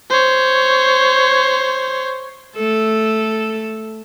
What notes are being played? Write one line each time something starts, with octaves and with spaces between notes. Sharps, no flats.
C5 C#5
A3 A4